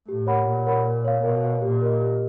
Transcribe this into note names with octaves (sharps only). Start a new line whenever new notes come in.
A2 G4
A#4 C#5 F#5 B5
A#2 G4
A#4 C#5 F#5 B5
A#4
C#5 F5
B2 A#4
C#5 F5
A#2 G4
A#4 D#5
G4